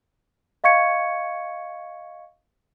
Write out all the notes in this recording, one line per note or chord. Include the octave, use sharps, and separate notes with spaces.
D#5 F5 C#6 G#6 C#7